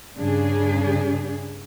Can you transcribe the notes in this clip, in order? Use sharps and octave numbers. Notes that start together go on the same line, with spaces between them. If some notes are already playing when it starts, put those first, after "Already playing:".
G2 C#3 D4 G#4